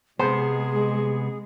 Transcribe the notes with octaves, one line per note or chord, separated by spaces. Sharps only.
C3 G#3 B3 G#4 C5